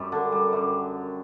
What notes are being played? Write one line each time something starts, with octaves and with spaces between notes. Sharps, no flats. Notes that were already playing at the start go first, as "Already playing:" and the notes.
Already playing: F#2 G3
D3
G3
F#2